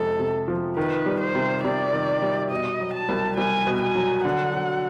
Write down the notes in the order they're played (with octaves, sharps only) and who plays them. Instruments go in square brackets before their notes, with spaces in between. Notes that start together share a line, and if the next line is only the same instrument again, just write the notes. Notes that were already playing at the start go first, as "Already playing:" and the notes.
Already playing: [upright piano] F2 C3 G#3 [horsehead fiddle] A4
[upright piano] C3
F3
[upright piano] D#3 [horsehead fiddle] B4
[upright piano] G3
[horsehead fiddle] C5
[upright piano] C3
[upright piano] C3 [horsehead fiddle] D5
[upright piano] D#3
G3
[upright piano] B2 [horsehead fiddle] D#5
[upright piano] F#3
[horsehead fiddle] A5
[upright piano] C2
[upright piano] C2 [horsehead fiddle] G#5
[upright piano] B2
[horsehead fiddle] G#5
[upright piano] F#3
[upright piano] D3 [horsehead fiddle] F#5
[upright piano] F#3